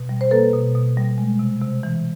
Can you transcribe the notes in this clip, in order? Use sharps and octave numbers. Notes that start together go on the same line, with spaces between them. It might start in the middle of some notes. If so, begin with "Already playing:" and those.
Already playing: B2
G3
C5
A#3 A4 B4
B2
B2
G3
G#3
C3
C3
E3